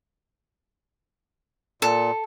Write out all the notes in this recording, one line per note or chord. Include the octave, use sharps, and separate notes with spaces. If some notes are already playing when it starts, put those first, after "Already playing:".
A#2 A4